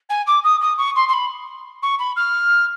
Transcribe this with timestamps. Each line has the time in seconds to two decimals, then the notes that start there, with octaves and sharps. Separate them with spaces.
0.09 G#5
0.26 D6
0.43 D#6
0.61 D#6
0.77 C#6
0.95 C6
1.08 C6
1.13 B5
1.82 C#6
1.99 B5
2.16 F6